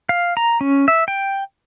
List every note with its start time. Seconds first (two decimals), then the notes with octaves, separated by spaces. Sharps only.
0.09 F5
0.37 A#5
0.61 C#4
0.88 E5
1.08 G5